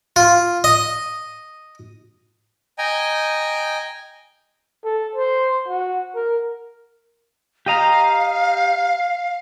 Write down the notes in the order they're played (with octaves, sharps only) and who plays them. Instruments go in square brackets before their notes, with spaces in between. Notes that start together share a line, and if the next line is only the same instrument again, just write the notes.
[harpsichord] F4
D#5
[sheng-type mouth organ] D#5 G5 G#5 A#5
[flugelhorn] A4
C5
F#4
A#4
[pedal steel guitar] G4 D#5 A#5 [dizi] F5